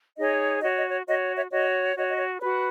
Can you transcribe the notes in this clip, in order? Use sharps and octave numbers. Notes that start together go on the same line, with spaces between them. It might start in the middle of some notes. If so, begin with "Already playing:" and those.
D#4 G#4 C#5 D#5
F#4 C#5 D#5
D#5
C#5
F#4 C#5 D#5
C#5 E5
F#4 C#5 D#5
F#4 C#5 D#5
D#5
C#5
F#4 B4 C#5